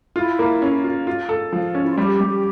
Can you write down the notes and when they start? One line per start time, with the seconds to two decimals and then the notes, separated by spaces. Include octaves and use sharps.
0.16 E4 F4
0.39 A#3
0.62 C#4
0.84 F4
1.07 F4
1.29 A4
1.52 F3
1.75 C#4
1.83 E4
1.90 F4
1.97 G3 G4
2.21 G3